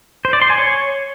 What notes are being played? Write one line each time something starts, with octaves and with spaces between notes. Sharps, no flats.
C5
D5
C6
G#5
C#5